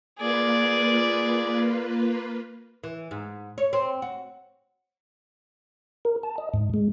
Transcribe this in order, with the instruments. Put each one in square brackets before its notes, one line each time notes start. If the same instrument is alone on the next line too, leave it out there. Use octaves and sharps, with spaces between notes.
[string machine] A#3 F4 B4 [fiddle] G#4 D5
[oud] E3
G#2
C#5
C4
F#4
[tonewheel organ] A#4
A5
D#5
G#2
G#3